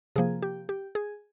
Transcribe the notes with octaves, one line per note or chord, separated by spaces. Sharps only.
C3 F3 A#3 G#4
G4
G4
G#4